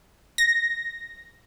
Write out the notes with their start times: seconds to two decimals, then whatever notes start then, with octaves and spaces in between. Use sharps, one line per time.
0.38 A#6